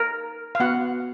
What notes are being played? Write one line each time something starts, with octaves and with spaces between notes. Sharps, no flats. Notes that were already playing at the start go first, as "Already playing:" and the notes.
Already playing: A#4
F5
B3 F#4 F#5